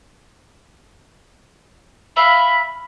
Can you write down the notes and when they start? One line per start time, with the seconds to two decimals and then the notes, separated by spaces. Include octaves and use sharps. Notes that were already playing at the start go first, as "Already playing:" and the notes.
2.17 E5 F5 B5